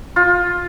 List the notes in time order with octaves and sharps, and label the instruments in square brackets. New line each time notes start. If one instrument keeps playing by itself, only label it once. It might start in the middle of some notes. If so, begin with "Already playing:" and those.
[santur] F4